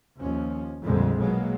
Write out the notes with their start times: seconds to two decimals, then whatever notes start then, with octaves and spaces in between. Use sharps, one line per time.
0.18 D#2 F3 C#4
0.83 A#1 F2 A#2 D3 G3 G#3
1.19 B2 F#3 G#3 A#3 B3